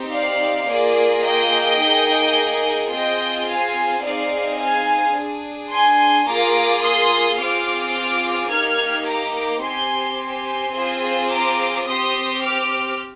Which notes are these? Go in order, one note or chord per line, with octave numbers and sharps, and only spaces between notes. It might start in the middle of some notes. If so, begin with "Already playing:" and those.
Already playing: C4 D#4 G4
D5 F5
A#3 F4 G#4 D5
D#5 G5
A#3 D#4 G#4
C4 F4 G#4 D#5 G5
F5 G#5
C4 D#4 G#4 D5 F5
F5 G#5
D4 G#4
G#5 C6
A#3 F4 G#4 A#5 D6
C6 D#6
C4 F4 G#4 D6 F6
A#3 D#4 G4 F6 G#6
A#5 D6
C4 G4 G#5 C6
G#5 C6
C4 F4 G#4
A#5 D6
C4 G4 C6 D#6
D6 F6